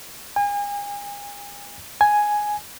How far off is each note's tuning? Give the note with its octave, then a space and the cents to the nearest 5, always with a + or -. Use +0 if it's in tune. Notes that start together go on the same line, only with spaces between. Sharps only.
G#5 -35
G#5 +5